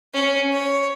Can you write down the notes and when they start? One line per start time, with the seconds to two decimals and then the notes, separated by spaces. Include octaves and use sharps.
0.14 C#4
0.52 C#5